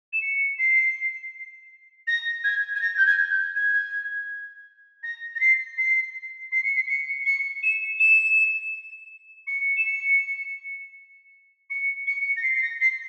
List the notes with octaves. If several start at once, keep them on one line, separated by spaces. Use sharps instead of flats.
E7
C#7
C7
A#6
G#6
G#6
A#6
G6
G#6
G6
G#6
A#6
A#6
C7
C7
C7
C#7
C7
C#7
C#7
E7
E7
C#7
E7
C#7
C#7
C#7
A#6
C7
C7
A#6
C7